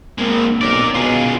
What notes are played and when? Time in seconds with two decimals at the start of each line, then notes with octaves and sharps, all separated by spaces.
0.18 G#3 A#3 C4
0.61 B1 A#4 D5
0.95 B2 F4 G#4